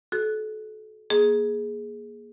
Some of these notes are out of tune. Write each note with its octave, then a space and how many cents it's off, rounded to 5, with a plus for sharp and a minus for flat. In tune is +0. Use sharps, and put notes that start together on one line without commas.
F#4 +0 A4 -30
A#3 +25 G#4 +10